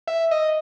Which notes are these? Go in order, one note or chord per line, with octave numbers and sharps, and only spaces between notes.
E5
D#5